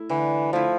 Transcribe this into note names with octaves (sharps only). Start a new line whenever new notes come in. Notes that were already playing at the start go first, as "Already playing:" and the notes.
Already playing: A3 E4
D3 E3
F3 A3 E4